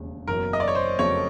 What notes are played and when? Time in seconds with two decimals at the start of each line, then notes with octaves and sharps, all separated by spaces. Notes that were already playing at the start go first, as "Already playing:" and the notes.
Already playing: E1 D#2 C#3
0.28 F#1 E2 B2 F#3 A#4
0.53 D#5
0.60 D5
0.68 C#5
0.75 C5
0.99 F2 C#3 F#3 A3 C4 C#5